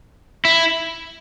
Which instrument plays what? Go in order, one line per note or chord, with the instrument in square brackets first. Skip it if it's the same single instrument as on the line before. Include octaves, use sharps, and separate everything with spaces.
[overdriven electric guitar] E4